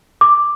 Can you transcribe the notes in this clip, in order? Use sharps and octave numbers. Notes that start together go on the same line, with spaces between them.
D6